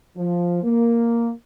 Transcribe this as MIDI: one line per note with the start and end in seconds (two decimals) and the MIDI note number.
0.17 0.61 53
0.64 1.32 58